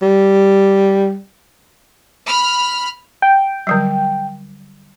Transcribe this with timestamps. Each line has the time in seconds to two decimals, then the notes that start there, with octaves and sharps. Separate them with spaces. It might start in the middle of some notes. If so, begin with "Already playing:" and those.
0.02 G3
2.25 B5 F6
3.22 G5
3.67 D3 F#3 G3